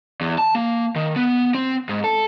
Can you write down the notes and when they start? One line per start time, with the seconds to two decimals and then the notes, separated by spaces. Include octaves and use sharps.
0.21 E2
0.38 A5
0.55 A#3
0.96 D#3
1.16 B3
1.55 C4
1.89 G#2
2.04 A4